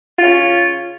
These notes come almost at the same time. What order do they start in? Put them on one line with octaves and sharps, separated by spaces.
F4 C#4 C#3